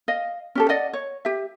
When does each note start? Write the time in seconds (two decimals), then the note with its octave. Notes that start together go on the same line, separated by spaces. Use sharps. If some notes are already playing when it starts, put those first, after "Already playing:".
0.08 D#5 F5
0.55 C#4 G4 A4
0.69 D5 D#5 F#5
0.93 C#5
1.25 G4 E5